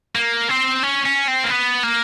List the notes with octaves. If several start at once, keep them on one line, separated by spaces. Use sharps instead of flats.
A#3
C4
C#4
C#4
C4
A#3
B3
A#3